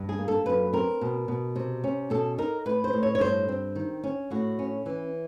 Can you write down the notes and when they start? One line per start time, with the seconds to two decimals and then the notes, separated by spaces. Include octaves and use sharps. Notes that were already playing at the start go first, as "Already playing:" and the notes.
Already playing: G2
0.09 G#4
0.18 A#3
0.28 A4
0.46 F#2 B4
0.73 C4 A#4
1.01 B2
1.28 B2
1.56 C3
1.84 C#4
2.10 B2 A4
2.38 D#4 A#4
2.65 A2 B4
2.84 C5
2.93 A2
3.03 C#5
3.15 C#5
3.21 G2 C5
3.48 C4
3.76 D#3
4.04 C#4
4.31 A2 F#4
4.59 C#4
4.86 E3